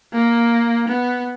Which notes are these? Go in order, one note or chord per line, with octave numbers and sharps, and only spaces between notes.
A#3
B3